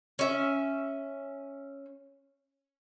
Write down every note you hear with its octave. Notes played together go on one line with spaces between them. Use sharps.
C#4 E5